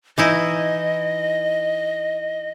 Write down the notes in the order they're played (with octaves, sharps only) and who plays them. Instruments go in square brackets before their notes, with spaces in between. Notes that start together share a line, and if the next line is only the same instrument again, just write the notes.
[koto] E3 D#4 E4 [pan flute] D#5